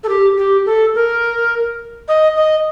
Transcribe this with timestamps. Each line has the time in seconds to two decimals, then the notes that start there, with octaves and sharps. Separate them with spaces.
0.04 A4
0.09 G4
0.37 G4
0.66 A4
0.95 A#4
2.08 D#5
2.36 D#5